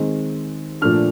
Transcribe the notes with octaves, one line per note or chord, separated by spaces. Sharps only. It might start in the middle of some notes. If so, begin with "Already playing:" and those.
Already playing: D#3 G#3 C4 D#4
A#2 F3 A3 D4 F6